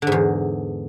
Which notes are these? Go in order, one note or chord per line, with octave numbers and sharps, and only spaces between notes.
E2 G#2 D3